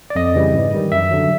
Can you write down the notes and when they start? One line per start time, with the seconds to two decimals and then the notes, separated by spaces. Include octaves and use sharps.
0.10 D5
0.15 F2 D#5
0.35 C#3 E3 G3
0.54 G#2
0.73 D#3 G3
0.92 F#2 E5
1.11 D3 F#3